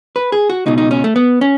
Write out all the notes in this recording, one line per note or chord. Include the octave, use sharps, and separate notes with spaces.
B4
G#4
F#4
C#2 B2 D#4
D#4
C#4
A3
B3
C#4